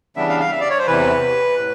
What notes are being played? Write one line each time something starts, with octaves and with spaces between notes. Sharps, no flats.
C#3 E3 G3 B3 D4 E5
F5
F5
E5
D5
C#5
C5
E2 C3 E3 B4
A2